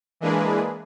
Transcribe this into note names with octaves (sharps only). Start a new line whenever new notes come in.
E3 G#3 A#3 D4 G#4 B4